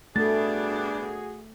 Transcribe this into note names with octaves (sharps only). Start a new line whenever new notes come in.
B2 G3 A3 D4 F#4 G#4 A4 A6